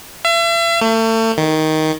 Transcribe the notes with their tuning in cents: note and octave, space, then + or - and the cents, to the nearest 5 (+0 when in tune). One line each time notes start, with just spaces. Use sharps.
E5 +40
A3 +35
D#3 +10